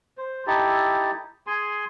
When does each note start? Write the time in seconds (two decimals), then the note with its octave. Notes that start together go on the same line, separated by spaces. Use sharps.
0.18 C5
0.47 D#4 E4 G4 A4
1.47 G#4 G#5 C6